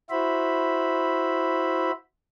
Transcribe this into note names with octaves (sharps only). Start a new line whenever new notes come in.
E4 F#4 C5 E5 B5